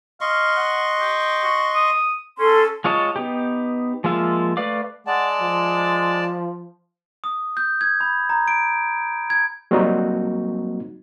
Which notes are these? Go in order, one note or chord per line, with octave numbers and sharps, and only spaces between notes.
D#5 F5 C6 C#6
F#5
G4
F#4
D#6
C#4 A4 C6
G#3 F4 C#5 D#5 A5
B3 D#4 G4
F3 G#3 A#3 F4 E5
A3 B4 D5 F5 D6
G#3 D5 F#5 A5
F3
D#6
G6
G#6
B5
A#5
D7
G#6
F#3 G3 A#3 C4 D#4 F#4